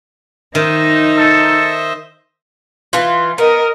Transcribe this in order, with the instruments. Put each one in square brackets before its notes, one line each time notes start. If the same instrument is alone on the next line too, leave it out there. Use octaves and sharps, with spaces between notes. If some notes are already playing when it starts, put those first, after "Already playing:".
[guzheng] D#3 [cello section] D#4 [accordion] C5 D#5 E5
[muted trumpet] A4
[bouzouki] E3 F4
[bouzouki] B3 [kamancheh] A#4 D#5